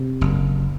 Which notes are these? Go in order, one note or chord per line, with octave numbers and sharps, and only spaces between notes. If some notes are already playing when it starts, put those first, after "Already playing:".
Already playing: C3
F#1